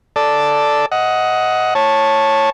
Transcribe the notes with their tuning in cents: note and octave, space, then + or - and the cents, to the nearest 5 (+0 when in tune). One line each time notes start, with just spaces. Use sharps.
A4 +0 D5 +0
D#5 +15 F#5 +0
C#5 -10 A5 +0